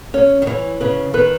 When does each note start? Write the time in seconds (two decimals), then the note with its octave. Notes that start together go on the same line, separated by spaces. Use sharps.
0.14 C#4 C#5
0.42 D#3
0.47 E3 C#5
0.80 C#3 B4
1.14 D#3 B4